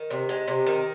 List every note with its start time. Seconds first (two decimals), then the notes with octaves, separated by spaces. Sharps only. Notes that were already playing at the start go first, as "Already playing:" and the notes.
Already playing: D#3
0.10 C3
0.29 G#3
0.48 C3
0.66 D#3